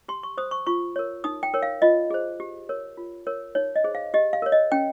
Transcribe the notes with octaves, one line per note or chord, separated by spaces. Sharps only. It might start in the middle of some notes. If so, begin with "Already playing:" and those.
G4 C6
C#6
C5 D#6
C#6
F4 C#6
A#4 C#5
D#4 D#6
G5
A#4 C#5
F5
F4 D#5
G#4 C5
G4
A#4 C#5
F4
A#4 C#5
D#4 C#5
D#5
G#4 C5
F5
G4 D#5
F5
A#4 C#5
D#5
C#4 G5